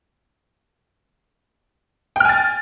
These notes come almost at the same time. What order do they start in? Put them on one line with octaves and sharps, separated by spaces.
G5 F6 G#5 A6